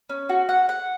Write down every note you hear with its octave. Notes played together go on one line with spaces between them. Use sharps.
C#4
F#4
F#5
F#5